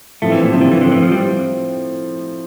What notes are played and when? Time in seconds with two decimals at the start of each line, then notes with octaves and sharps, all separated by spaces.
0.22 A2 F3 A3 C4
0.32 E3
0.41 A#2
0.52 A2 C3 F3 C4
0.61 D3
0.72 E3
0.81 A2 D3 F3 C4
0.92 E3
1.02 F3
1.12 G3 C4